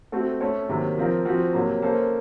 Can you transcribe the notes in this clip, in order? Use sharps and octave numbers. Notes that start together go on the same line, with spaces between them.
A3 C4 F#4 A4
A3 C#4 A4 C#5
C3 D#3 F#3 A#3
F3 C4 F4 A#4
F3 C4 F#4
C3 F#3 A#3
A#3 C#4 A4 C5